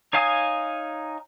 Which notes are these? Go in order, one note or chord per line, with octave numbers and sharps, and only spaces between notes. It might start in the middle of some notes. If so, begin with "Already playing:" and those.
D#4 C#5 F5 G#5 D#6